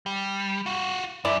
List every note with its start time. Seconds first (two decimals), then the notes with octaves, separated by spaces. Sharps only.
0.06 G3
0.66 F4 F#4
1.25 F#2 E4 D5